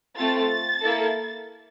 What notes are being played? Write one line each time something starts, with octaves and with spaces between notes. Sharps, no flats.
A3 C4 F4 A4 A6
A#3 E4 A4